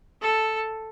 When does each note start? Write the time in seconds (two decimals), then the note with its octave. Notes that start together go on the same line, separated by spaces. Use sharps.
0.22 A4